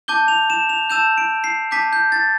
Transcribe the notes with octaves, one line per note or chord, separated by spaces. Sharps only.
A5 D6 G6 G7
F7
E7
F7
A5 E6 G6 E7
D7
C7
A5 D6 G6 B6
G6
A6